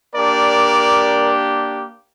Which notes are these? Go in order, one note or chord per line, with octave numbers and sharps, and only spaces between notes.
A#3 D4 G4 A#4 D5